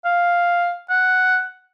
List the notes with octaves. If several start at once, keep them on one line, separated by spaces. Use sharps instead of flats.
F5
F#5